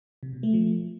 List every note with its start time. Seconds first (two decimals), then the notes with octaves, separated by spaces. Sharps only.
0.23 C3
0.33 B2
0.43 A3
0.54 F3